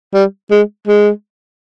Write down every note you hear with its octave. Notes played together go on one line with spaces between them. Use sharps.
G3
G#3
G#3